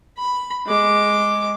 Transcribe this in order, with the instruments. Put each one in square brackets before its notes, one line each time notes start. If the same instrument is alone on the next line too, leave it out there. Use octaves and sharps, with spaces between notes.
[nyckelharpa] B5
G#3 D6